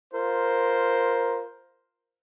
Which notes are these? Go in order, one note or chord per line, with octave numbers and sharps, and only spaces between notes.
F4 A#4 C5